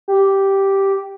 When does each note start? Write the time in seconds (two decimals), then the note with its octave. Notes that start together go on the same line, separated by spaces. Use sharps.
0.08 G4